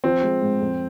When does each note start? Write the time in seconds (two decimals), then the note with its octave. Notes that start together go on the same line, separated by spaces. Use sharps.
0.04 F3 C4
0.22 G#3
0.42 G#2
0.61 F2